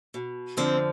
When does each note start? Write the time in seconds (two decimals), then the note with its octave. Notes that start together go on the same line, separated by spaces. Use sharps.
0.14 B2
0.57 F2 D3 F3 C4